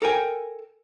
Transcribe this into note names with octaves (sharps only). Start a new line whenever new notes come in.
A4 A#4 G5 G#5